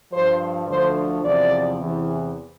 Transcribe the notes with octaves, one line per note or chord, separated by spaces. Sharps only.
G2 F3 C5
D2 D3 F3 C5
E2 C3 F3 D5
E2 C3 E3